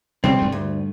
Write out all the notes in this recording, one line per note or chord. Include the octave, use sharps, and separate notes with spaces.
C3 G3 A3 C4
G2 A3
D2